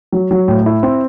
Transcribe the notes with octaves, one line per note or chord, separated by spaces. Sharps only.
F#3
F#3
A2
E4
C4